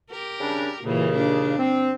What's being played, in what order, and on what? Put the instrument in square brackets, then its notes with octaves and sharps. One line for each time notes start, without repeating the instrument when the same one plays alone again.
[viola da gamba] G4 A#4
[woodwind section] C#3 G3 D4
[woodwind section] D#2 C#3 [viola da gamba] A#2 E3
[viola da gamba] D4
[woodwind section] C4